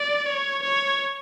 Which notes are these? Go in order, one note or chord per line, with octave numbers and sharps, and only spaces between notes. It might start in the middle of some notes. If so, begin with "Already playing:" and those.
Already playing: D5
C#5
C#5